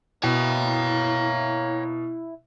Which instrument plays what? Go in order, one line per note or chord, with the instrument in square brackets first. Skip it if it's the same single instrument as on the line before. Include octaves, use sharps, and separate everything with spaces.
[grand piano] B2 [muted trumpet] A#3 [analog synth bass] E4 [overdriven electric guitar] C#5 G5